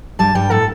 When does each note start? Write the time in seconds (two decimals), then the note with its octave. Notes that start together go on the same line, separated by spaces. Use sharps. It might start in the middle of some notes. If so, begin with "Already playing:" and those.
0.19 G2 G3 A5
0.35 G2 G3 G5
0.51 A2 A3 A4